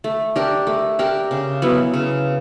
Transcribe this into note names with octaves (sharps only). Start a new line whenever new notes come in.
A3
D4 G4 A#4
A3
D4 G4 A#4
C#3
F#3 B3 E4
C#3